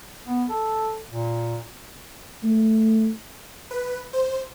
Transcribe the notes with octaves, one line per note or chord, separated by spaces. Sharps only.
B3
A4
A#2
A3
B4
C5